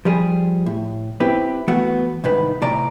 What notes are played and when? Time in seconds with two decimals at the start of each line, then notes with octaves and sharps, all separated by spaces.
0.05 F3 G3 G#4
0.66 A2
1.20 C4 E4 G4 B4
1.68 E3 A3 B3 F#4 F#5
2.24 C2 G#2 D#3 B4
2.62 A2 C3 D5 A#5